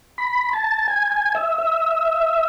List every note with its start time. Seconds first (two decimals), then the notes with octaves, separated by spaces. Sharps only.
0.18 B5
0.53 A5
0.88 G#5
1.12 G#5
1.35 E5
1.58 E5